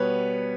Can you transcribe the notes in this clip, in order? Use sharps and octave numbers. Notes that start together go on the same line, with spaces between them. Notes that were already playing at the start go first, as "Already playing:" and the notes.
Already playing: B2 G3 B3 B4 C#5